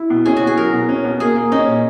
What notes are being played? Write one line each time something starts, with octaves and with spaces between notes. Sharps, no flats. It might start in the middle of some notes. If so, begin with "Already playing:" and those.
Already playing: E4
B2
C#4 G#4
F#4
B2
G#4
F#3 A#4
B2
C#4
B2
A#3 G#4
A#3
C#4 D#4
A#2